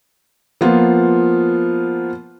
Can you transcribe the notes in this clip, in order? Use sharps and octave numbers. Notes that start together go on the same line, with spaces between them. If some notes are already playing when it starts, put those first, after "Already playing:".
F3 A#3 B3 F4